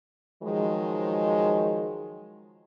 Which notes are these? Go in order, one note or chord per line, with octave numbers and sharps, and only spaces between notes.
D#3 F3 F#3 G#3